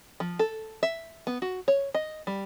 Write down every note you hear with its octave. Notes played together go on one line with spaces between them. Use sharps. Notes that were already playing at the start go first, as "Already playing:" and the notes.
F3
A4
E5
B3
F#4
C#5
D#5
G3